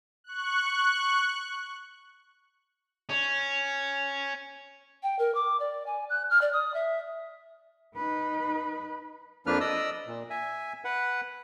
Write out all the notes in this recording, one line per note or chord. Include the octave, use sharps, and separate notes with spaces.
C#6 F#6
C#4
G5
A#4
D6
D5
G#5
F#6
F6
D5
D#6
E5
D#4 B4
F2 F3 A#3 D4 B4 F6
D5 D#5 D#6 E6
A#2
E5 G#5
B4 F#5